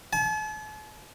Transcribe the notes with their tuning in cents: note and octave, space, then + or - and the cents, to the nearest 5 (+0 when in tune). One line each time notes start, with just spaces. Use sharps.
A5 -45